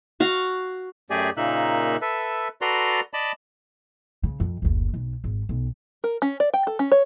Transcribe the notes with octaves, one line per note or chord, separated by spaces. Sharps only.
F#4 F5
F#2 A3 G4 G#4 D5 G#5
A#2 C#3 A#3 D#4 E5 F#6
A4 B4 E5
F#4 A4 B4 D5 A#5 C6
D5 D#5 A5 B5
C#3
F2
F#1 D2
B1
G#1
B1
A#4
C#4
D5
G5
A4
C#4
C#5